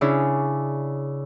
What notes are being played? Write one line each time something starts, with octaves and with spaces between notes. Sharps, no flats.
C#3 C#4 D4 E4